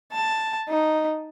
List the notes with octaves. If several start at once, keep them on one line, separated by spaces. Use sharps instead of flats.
A5
D#4